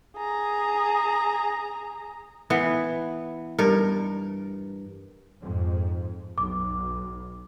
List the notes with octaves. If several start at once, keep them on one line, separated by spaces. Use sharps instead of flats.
G#4 A#5
E3 B3
G2 A#4
F2 G#2
B1 D6